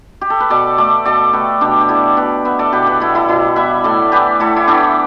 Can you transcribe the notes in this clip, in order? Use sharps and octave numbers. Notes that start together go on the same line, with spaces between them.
G4
A4
B4
B2 A4 D5
A3 A4 D5
B2 A4 D5
A3 G4 B4
B2 D4 G4
G4
B3 E4 A4
B2 G4 B4
B3 B4 E5
A4 D5
B2 G4 B4
G4 B4
G3 B3 E4 A4
E4 A4
B2 E4
G3 B3 B4 E5
A2 A4 D5
E3 B3 G4 B4
A2 E4 A4
E4
E3 B3 D4 G4